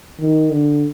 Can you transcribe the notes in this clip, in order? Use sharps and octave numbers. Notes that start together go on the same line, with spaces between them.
D#3
D3